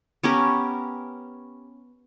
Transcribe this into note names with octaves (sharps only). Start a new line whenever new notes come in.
B3 C#4 G4 A#4